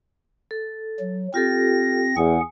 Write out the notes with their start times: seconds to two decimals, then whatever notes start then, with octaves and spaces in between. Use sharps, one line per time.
0.51 A4
1.00 F#3
1.34 C4 F4 G4 A4 A#6
2.17 E2 G#4 F#5 G#5